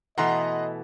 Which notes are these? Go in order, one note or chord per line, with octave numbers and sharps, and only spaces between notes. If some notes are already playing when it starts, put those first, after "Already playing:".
B2 E3 A3 D#5 F#5 A#5 C6